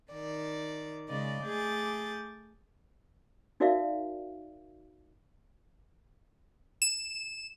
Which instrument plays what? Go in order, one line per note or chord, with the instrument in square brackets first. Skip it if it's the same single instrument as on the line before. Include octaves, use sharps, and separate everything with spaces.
[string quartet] D#3 D5
C#3 G#3 D5 D#5
A3 G#4 D6 G6 A6
[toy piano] D#4 F#4 A#4 D5 E5 F5
[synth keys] E7